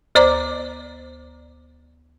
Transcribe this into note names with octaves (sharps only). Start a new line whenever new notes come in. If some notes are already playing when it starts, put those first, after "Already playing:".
D2 C5 D5 A#5 D6